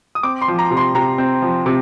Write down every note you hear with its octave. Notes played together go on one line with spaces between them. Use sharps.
D#6
C4 D6
C6
F3
A#5
C3
C6
C3 A#5
C4
F3
C3